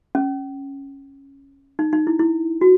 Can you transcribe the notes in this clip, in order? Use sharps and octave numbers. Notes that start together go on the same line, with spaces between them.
C#4
D#4
D#4
E4
E4
F#4